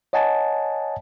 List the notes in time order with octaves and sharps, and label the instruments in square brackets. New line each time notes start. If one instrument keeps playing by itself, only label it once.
[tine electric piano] C#5 D#5 F#5 G#5 A5